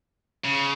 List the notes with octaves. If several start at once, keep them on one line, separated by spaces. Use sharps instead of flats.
C#3